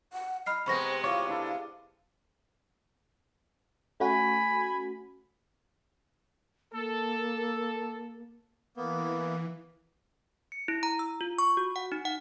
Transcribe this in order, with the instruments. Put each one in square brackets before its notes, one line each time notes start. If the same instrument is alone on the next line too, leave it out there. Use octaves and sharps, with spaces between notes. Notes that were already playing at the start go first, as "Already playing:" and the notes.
[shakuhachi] F#5
[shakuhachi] D#5 [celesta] B5 F6 C7
[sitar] C3 G#3 B3 [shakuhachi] C5 [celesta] B5 C#6 A#6
[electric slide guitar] E4 F4 C#5 [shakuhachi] F5 [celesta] D6
[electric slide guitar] D4 E4 A4
[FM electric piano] A3 C#4 F#4 [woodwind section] G#5 B5
[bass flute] A#3 [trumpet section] A4
[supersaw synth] E3 [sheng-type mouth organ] A#3 B3
[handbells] C#7
E4
A#5
E6
F4
C#6
F#4
F#5
D#4
F#5